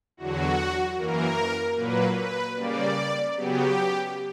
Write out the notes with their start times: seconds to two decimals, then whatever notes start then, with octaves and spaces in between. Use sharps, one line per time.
0.17 E2 D3 F#3 F#4
0.97 F#2 E3 A#3 A#4
1.76 A#2 F#3 A#3 B4
2.16 B4
2.56 C#3 G3 A#3 D5
3.36 C#3 F#3 B3 G4